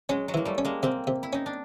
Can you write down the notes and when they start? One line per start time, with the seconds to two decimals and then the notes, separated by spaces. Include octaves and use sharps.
0.09 F#3 G#3 C#4
0.28 F#3 G#3
0.34 E3 A#3
0.45 G3 A3
0.58 C#4
0.65 G#3 A#3
0.83 C3 A#3 C4
1.07 C3
1.23 E4
1.33 C#4 D#4
1.46 D4